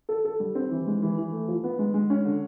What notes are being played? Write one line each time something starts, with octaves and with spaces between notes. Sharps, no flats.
A4
A4
G3
C4
E3
G#3
E3
E3
A3
F3
B3
G#3
G#3
C#4
D3